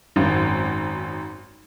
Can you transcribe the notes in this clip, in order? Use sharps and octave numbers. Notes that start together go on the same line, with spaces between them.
G#1 F#2